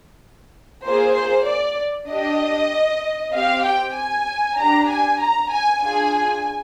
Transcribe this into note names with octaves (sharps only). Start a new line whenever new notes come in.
A#3 F4 G#4 C5
C5
D5
D4 G4 D#5
C4 G4 F5
G5
G#5
D4 G4 A#5
G#5
A#5
G#5
D4 F4 G#4 G#5